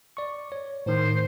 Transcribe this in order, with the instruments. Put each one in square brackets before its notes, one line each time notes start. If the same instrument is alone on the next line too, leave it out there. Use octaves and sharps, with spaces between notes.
[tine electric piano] D5 C#6
C#5
[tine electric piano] A2 D#3 [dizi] C5